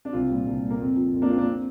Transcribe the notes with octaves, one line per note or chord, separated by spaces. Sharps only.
D4
C2 C4 F4
A#2 G3
C2
A#2 G3
A#3
F2 C4
F3
F2
A#3 D4
F3 C4 F4
A#3 D4
C4